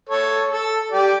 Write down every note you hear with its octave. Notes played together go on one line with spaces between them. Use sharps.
A4 C#5
A4
G4 D5